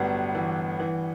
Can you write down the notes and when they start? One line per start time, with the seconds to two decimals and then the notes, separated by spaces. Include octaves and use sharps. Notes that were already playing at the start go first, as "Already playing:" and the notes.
Already playing: G1 A2 F#3 G3 B3
0.35 E3
0.80 E3